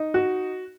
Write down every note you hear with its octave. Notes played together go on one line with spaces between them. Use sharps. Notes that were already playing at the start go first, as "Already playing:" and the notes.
Already playing: D#4
F#4